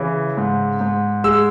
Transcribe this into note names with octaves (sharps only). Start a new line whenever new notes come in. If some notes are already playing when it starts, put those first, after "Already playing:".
Already playing: C#3 E3
G#2
G#2
G#3 E6